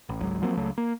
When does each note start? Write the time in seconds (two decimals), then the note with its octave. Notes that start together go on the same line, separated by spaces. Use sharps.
0.09 A1
0.20 G#1 C#2 F#3
0.42 F3 F#3 A#3 C4
0.57 C#2 C#3 F#3 A3
0.78 A#3